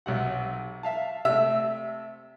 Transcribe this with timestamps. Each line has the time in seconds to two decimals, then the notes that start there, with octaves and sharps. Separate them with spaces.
0.06 B1 C3 F#5
0.83 E5 F5 A5
1.25 C3 A3 E5